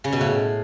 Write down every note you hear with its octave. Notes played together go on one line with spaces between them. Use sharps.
C#3
B2
A2